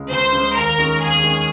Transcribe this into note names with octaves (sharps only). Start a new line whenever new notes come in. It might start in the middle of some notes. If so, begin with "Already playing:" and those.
Already playing: C#2 C#3 G#3
C#2 C5
C#3 G#3
D#2 A#4
D#3 G#3 C#4
D#2 G#4
D#3 G#3 C#4